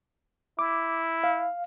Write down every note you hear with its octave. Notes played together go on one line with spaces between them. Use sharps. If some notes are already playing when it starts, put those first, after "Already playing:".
E4 D6
F5